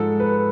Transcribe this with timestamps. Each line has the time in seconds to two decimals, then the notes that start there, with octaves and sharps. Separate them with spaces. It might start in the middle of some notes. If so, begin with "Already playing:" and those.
Already playing: G#2 F3 A4
0.20 B4